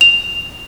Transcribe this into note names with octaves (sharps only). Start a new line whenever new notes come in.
F7